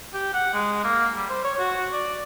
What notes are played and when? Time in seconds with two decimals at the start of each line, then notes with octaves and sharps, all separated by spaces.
0.14 G4
0.34 F#5
0.54 G#3
0.84 A#3
1.16 G3
1.30 C5
1.44 C#5
1.59 F#4
1.93 D5